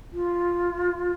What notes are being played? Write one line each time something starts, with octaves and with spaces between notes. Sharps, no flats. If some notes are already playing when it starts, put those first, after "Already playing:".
F4